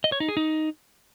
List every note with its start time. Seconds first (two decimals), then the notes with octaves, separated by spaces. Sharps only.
0.04 D#5
0.12 C#5
0.20 D#4
0.28 G#4
0.37 D#4